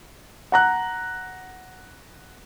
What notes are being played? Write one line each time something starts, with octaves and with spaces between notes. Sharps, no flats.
F#5 A#5 F#6